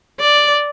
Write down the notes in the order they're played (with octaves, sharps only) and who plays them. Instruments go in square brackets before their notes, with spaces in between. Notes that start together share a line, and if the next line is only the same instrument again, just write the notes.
[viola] D5